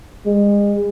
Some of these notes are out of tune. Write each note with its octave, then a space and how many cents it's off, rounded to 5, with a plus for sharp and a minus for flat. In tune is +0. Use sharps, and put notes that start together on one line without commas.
G#3 -35